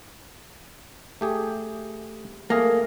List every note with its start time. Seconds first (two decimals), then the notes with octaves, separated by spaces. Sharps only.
1.21 A3 G4 G#4
2.50 A3 A#3 G#4